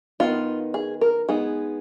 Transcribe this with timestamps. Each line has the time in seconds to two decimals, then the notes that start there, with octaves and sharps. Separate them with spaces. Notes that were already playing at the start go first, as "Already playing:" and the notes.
0.20 D#3 G#3 B3 D#4 F4
0.74 G#4
1.01 A#4
1.29 G#3 B3 D#4 G#4